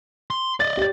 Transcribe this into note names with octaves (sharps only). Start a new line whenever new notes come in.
C6
D5 D#5 A6
G4 A6